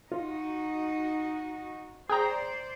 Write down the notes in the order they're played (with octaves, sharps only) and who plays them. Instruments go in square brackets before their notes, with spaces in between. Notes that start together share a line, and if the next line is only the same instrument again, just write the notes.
[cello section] D#4 F#4 [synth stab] F4
[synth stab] G#4 G5 A#5 [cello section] C5 D5